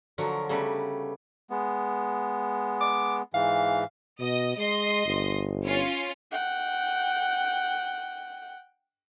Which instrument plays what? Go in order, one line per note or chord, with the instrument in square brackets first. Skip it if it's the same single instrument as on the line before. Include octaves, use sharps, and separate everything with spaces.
[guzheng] D3 F3 F#3 F#4 A#4
C#3 G3 A3 B3 B4
[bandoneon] G#3 B3
[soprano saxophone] D6
[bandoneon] G#2 E3 [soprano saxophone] F5
[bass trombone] B2 [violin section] D#5
[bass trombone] G#3 [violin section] D#5 C6
[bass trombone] G1
[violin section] C#4 F4
[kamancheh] F#5 G5